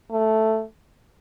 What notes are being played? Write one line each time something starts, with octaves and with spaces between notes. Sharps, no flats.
A3